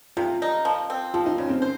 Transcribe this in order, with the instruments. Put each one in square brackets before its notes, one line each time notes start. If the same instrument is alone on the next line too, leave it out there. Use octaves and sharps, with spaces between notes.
[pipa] C3 [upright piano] F4
[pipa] D#4
F3
C4
[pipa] F3 [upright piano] F4
[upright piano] D#4
[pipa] C#3 [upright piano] C#4
[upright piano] C4
[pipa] C5